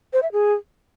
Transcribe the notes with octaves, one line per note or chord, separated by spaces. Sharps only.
C5
E5
G#4